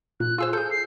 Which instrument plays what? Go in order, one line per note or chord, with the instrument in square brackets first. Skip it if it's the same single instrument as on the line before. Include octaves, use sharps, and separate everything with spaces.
[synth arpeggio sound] A#2 [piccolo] F#6
[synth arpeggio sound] F4 G#4 C5 [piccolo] E6
[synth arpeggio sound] G#4 A4 [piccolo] G6
[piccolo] C7